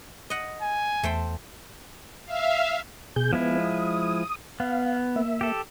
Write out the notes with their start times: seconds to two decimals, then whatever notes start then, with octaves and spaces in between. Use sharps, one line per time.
0.30 D#5 F#5
0.62 G#5
1.03 E2 A3 C5 G5
2.26 E5 F5
3.16 B2 G#4 G6
3.33 F3 G#3 B3 E4
3.59 D#6
4.60 B3 F5
5.16 A#3 E5
5.41 G4 A4